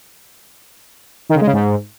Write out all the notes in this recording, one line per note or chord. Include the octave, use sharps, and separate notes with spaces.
D#3
C#3
G#3
C#3
G#2